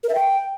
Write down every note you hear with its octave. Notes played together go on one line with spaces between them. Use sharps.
A#4
E5
G5